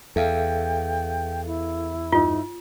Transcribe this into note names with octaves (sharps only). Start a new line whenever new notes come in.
E2 A4 E5 F5 G5
E4
G2 D#4 F4